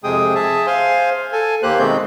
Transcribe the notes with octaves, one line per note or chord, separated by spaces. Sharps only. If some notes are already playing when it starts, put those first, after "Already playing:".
F2 C3 G#3 G#4 G5 D#6
G#4 E5 A5
C5 F5 G#5 C6
A4 G#5
D#2 A#3 G4 C5 F#6
B2 D#3 G#3 A3 C4 G6